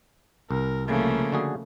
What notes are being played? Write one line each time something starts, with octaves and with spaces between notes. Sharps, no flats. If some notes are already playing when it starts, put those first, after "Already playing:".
C2 A#4
C#3 F3 A3 A#3
D3 F#4 G#4